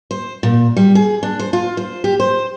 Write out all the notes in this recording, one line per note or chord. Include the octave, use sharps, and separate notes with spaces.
C5
A#2
G3
G#4
D4
C5
F4
C5
G4
C5